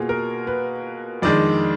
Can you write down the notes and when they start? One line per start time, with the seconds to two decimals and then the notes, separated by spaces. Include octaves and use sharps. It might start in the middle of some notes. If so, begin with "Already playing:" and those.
Already playing: B2 A#3 F4 G#4
0.09 A#4
0.47 B4
1.22 F2 D#3 G#3 D4 D5